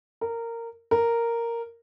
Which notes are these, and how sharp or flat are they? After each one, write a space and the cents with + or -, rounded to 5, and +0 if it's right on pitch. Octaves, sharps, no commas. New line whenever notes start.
A#4 -15
A#4 -5